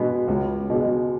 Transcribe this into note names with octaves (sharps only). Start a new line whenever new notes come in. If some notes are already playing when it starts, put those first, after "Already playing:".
Already playing: B2 G#3 B3
C#2
B2 G#3